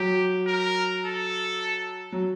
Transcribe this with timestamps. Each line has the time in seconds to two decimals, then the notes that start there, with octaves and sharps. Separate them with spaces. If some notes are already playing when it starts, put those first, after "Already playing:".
Already playing: F#3 G4
0.47 A#4
1.05 A4
2.12 F#3